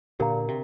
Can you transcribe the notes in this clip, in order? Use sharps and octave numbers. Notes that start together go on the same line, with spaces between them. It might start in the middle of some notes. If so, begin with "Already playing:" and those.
A#2 D3 G4 A#4 F5 A#5
C3 G4